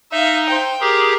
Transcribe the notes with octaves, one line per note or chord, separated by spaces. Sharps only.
D#4 E5 F5
C5 G5
G4 G#4 A#4